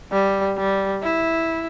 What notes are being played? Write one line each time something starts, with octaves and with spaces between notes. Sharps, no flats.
G3
G3
E4